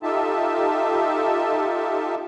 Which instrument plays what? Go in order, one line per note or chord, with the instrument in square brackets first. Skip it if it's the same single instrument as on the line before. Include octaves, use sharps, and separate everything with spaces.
[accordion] D#4 F4 G4 A4 E5 A5